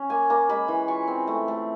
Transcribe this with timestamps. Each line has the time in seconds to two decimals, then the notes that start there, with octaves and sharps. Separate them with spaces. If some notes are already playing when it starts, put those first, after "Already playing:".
Already playing: C#4
0.10 A#3 G#5
0.30 A#3 A#5
0.49 G#3 B5
0.68 E3
0.88 F4 C#6
1.07 C4
1.27 A3
1.48 A3